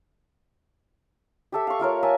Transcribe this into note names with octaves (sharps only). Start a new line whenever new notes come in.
G4 A4 E5
F5 C#6
A3 F4 A#4 C#5
A#4 E5 G#5 A5